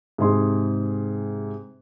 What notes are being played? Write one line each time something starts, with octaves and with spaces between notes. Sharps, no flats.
G#2 C3 G#4 D#5 C6